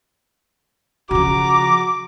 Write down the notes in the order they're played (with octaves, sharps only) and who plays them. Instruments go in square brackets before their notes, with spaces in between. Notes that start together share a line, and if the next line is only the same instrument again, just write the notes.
[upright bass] C#3 F3 [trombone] F#4 [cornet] A#5 [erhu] D6